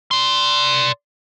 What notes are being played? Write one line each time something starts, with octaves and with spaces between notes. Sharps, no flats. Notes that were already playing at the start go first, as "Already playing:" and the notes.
D5 C6